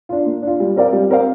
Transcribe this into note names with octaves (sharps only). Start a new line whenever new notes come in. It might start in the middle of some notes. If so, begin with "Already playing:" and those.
D4 F4
A#3
D4 F4
G3
C4 A#4 D5 F5
G3
C4 A#4 D5 F5